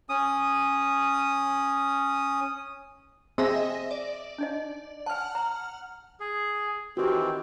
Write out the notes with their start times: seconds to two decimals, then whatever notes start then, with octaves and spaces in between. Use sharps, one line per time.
0.09 C#4 D#6
3.38 C4 G#4 D#5 E5 C6 A#6
3.91 D5
4.38 D4 D#4 D#5
5.06 F#5 G#5 A5 F6
5.35 A#5
6.20 G#4
6.97 D#3 E3 C4 F#4 G4